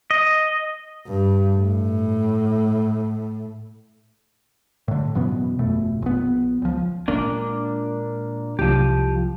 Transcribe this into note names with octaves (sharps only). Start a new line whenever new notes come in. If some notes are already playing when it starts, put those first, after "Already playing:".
D#5
G2
A2
A2 D3
F#2 B2 E3 B3
G1 F2 B2 A3
A#1 B3
C#2 F3
A#2 G#3 A#3 D4
C2 F3 F#3 G4